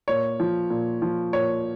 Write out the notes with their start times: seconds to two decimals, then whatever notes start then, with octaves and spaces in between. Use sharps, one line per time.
0.08 A#2 C#5
0.40 F3
0.70 A#2
1.02 F3
1.33 A#2 C#5